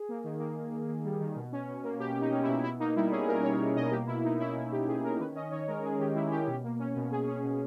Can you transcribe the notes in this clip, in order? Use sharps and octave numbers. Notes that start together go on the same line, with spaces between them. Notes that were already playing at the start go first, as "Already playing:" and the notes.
Already playing: G#4
A#3
D#3
A#3
A#3
A#3
A#3
G3
D#3
B2
C#4
B2
A#3
B2 G4
B2
D#4
C#4
E4
B2
B2 E4
A#3 D#4
G3 E4
C#4 G#4
G3 A#4
G3 C#5
G3
B2 D#5
A#3 G4
B2 E4
B2 D#4
C#4 E4
B2 E4
B2 G4
B2 G#4
C#4 A#4
D#3 B4
C#4 D#5
D#3 C#5
G#3 A#4
G#3 G#4
D#3 G4
G#3 E4
C#4 G4
B2
A#3
C#4
B2
B2 G#4
C#4
B2